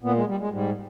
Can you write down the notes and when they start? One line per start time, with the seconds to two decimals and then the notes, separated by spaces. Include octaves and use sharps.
0.03 A#2 B3
0.16 G#3
0.28 G3
0.40 G#3
0.52 G#2 G3